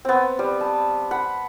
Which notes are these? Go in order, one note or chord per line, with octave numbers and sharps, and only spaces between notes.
B3 C4
G3
A5
F#5 B5